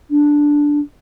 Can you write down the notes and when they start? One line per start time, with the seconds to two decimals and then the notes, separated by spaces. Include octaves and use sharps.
0.10 D4